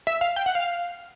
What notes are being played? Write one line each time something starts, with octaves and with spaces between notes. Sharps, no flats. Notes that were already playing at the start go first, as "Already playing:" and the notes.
E5
F5
G5
F#5
F5